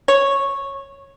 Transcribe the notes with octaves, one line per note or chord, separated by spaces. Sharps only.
C#5